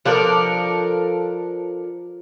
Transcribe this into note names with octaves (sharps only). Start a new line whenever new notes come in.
F3 D4 A4 A#4